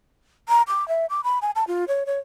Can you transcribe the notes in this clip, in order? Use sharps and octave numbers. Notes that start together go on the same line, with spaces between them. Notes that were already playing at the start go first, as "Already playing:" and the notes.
A#5
D6
E5
D6
B5
G#5
A5
F4
C#5
C#5